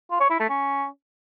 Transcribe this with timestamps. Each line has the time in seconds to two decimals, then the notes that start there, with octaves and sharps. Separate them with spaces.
0.11 F4
0.20 C#5
0.30 E4
0.40 A3
0.50 C#4